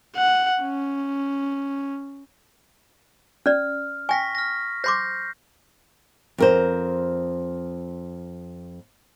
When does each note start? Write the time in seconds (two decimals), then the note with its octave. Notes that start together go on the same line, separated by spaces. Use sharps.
0.16 F#5
0.62 C#4
3.46 C#4 D5 F6
4.09 G5 G#5 C#6 A#6 B6
4.35 F6 A#6
4.84 C5 C6 D6 G6 A#6 C7
6.38 F2 A#4 C5